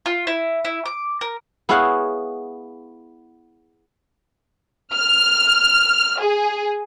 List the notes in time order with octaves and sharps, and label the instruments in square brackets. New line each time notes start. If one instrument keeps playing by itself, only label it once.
[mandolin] F4
E4
E4
D6
A#4
[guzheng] B3 E4 G#4 C#5 F5 F#5
[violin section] F6
G#4